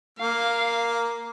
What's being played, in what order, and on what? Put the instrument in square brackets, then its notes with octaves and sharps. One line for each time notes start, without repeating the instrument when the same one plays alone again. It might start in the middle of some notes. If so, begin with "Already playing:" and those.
[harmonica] A#3 [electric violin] F5